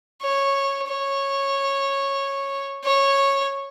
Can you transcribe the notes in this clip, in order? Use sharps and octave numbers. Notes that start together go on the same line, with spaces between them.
C#5
C#5
C#5